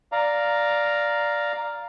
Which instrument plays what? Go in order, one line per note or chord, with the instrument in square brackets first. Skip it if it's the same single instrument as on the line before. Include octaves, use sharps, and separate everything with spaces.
[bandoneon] D5 F5 A#5